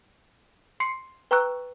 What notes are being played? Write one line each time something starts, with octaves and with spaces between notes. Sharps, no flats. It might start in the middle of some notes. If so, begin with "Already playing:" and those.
C6 C7 C#7
B4 G5 A#5 C#6 E6 F#6